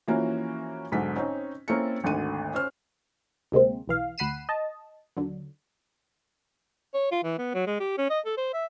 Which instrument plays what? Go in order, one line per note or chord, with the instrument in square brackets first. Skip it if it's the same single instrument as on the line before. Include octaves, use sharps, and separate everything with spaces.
[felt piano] E3 F3 A#3 C#4 F#4
B1 G#2 D3 B6
C4 C#4 D#4
A#3 C4 C#4 E4 A4 C#7
G#1 D2 D3 F#6 D#7
C#4 C5 F6
[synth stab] D2 C3 G#3 A#3 C4
B1 E3 F5
D2 F#5 B5 C7 D#7 E7
D#5 A5
D#2 D3 F#3
[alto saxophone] C#5
F4
E3
B3
F#3
G#3
G4
C#4
D#5
A4
C5
E5